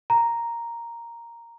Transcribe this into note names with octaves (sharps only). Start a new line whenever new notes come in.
A#5